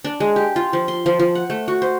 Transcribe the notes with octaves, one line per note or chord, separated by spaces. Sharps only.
D4
G#3
G4
F4
F3
C6
F3
F3
F#5
A3
F#4
C5